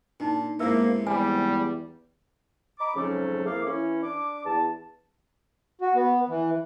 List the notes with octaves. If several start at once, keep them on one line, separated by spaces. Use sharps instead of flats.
A#2 D4 D#4 A5
G#2 C3 A#3 B3 E4 E5 E6
E2 G3 G#5
D#5 A#5 B5 D6
F2 G#2 C#3 F#3 A3 C#4
F2 A#3 E4 G#4 F5 D6
E3 C#4
D4 D6
E2 A5
F#4
B3
E3